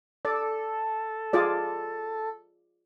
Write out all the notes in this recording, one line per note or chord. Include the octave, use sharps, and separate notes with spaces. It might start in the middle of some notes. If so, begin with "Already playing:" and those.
A4 D5
F4 G#4 D5